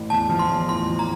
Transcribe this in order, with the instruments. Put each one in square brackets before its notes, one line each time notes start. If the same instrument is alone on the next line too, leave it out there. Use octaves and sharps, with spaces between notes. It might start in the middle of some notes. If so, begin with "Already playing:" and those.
Already playing: [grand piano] A1
[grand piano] E2 [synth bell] A5
[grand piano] F3
[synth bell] C6
[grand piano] E2
[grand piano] A1 [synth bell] C6
[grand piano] F3
[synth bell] A#5